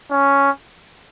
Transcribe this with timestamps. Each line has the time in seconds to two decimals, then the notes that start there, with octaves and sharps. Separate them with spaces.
0.11 C#4